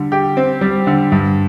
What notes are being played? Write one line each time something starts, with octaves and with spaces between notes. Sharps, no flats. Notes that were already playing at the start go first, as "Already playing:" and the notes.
Already playing: D3 G3
G4
C4
G3
D3
G2